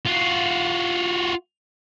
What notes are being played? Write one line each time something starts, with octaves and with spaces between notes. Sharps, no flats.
F4 F#4